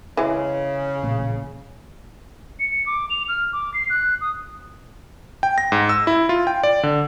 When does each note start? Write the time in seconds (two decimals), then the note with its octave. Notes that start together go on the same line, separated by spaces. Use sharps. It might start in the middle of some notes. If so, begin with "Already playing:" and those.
0.17 C#3 E3 G#3
1.03 A1 A#2
2.59 C#7
2.86 D6
3.10 F7
3.28 F6
3.53 D6
3.74 C7
3.89 F#6
4.21 D#6
5.43 G5
5.58 A#6
5.72 G#2
5.89 E6
6.07 E4
6.29 F4
6.47 G5
6.63 D5
6.83 D3